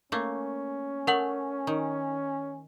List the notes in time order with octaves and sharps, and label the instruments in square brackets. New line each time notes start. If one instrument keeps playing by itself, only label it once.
[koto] A3 A#3 [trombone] C#4
[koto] A3 [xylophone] A#4 F#5 F#7
[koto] D#3